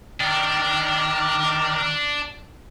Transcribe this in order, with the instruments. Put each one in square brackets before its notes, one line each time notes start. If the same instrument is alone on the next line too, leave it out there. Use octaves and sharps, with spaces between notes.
[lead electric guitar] D#3 [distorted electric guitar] D4 [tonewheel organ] A#5 D6 F6